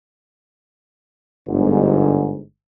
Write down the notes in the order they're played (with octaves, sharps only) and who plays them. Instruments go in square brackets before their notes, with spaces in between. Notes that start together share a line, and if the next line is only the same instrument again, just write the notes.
[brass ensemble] G1 G#2